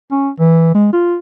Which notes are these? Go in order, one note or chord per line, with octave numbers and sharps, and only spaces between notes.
C#4
E3
G#3
F4